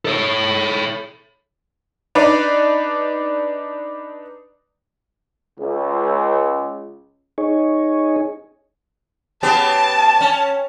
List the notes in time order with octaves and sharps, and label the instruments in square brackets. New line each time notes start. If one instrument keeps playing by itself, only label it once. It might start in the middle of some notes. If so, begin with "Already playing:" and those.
[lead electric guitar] A4 C#5
[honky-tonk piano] D4 D#4 B4 D5
[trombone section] C#2
[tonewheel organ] D#4 G#4 C#5
[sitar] C#3 B3 G4 [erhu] A5
[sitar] C#4